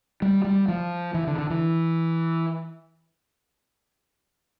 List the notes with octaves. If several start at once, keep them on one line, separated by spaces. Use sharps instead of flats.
G3
G3
F3
E3
D3
D3
E3